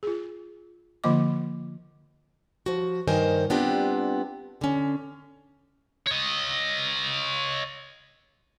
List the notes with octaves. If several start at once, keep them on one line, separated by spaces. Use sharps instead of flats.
F4 G#4
D3 F3 A#3 F4 D#5 D6
F3 F#4
G2 D#3 A#4 C5 D#5 G#5
G3 B3 C4 D4 F4 G4
D3 C#4
C#5 D#5